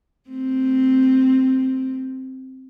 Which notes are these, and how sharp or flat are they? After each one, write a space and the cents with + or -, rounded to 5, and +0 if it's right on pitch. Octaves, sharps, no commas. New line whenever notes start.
A3 +15 C4 +0